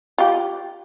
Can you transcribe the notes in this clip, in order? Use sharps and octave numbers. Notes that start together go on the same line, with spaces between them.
F4 G4